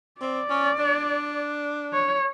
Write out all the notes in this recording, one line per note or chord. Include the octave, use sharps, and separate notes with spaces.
C4 D5
C#4
D4
C#5